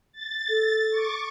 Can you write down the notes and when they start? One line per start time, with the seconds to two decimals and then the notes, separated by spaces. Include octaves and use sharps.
0.12 A6
0.49 A4
0.90 C#6 D6